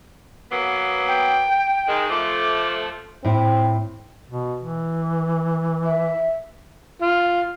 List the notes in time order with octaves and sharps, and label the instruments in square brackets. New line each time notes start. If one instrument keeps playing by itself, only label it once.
[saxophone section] F#3 A#3 B3
[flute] G5
[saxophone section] D#3 G#3
[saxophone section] F3 A3 [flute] D6
[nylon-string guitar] A2 E4 [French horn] C4
[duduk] B2
E3
[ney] E5
[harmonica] F4